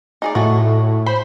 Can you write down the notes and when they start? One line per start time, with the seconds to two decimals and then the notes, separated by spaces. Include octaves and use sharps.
0.22 D#4 G#4 D5
0.35 A2 A3 F#4
1.06 C5 B5